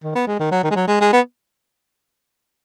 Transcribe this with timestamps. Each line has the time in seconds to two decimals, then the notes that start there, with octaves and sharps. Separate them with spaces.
0.04 D#3
0.15 B3
0.27 G#3
0.39 D#3
0.51 F#3
0.64 D#3
0.71 G#3
0.75 F#3
0.88 G#3
1.01 G#3
1.13 B3